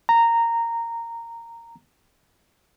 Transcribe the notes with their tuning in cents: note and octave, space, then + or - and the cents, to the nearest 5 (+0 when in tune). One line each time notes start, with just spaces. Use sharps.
A#5 -10